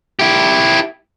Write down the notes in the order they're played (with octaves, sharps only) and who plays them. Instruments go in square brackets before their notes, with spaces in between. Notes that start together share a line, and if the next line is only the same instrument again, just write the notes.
[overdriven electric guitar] E4 G4